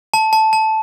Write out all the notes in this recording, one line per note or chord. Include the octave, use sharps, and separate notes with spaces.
A5
A5
A5